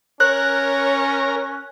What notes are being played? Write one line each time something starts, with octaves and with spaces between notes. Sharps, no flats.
C#4 A#4 C#5 F#6